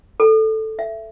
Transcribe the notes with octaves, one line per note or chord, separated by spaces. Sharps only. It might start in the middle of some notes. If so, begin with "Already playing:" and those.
A4
E5